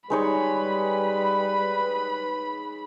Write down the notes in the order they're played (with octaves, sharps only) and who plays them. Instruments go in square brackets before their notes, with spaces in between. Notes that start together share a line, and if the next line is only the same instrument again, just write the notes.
[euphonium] G3 [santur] G#3 D#4 C#5 [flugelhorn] B4 [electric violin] B5